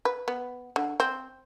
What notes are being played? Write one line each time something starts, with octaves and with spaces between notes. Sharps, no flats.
B4
B3
D3
C4